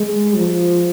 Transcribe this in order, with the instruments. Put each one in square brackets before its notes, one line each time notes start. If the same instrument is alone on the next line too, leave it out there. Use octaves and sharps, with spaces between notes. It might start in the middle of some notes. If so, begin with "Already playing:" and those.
Already playing: [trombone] G#3
F3